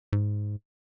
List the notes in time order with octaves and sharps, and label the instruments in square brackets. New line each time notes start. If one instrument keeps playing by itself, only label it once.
[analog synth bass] G#2